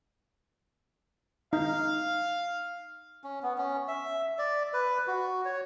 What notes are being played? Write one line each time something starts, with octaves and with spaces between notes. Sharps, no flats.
D#4 F5
C#4
B3
C#4
E5
D5
B4
F#4
C#5